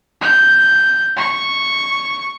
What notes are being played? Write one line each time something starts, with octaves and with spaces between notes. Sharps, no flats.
G6
C#6